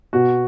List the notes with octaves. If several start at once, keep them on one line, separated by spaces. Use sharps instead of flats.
B2 F#4